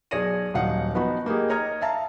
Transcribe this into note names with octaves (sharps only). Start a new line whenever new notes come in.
B1 G#4 C#5 D5 A#6 D#7
D#1 F#3 D#4 F5 F#5 C#7
F3 B3 D#4 F#4 F#5 B5
A#3 D#4 G4 G#4
C#5 D#5 A#5 D#6 F6 G#6
E5 F5 A5 A#5